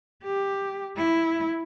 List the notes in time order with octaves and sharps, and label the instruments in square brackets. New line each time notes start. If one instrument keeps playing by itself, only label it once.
[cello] G4
E4